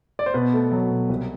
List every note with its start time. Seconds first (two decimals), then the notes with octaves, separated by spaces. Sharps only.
0.19 D5
0.26 C5
0.34 B2 B3 B4
0.53 A3
0.72 F#3
0.90 B2
1.09 C2